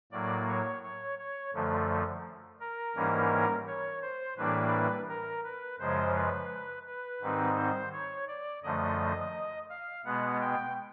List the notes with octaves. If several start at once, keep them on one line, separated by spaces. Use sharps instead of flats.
A2 F#3 A#3 D5
C#5
C#5
C#5
F#2 D3 F3 A3
A#4
G#2 E3 G3 A#3 C#4
C#5
C5
A2 E3 G3 A#3 D4 B4
A#4
B4
F#2 C#3 F3 G#3 C5
B4
B4
G#2 D#3 G3 C4 D#4
C5
C#5
D5
F#2 D3 F3 A3 D#5
F5
B2 G#3 B3 F#5
G5